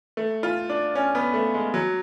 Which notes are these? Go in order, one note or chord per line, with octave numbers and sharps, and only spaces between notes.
A3
F4
D4
C#4
B3
A3
G#3
F#3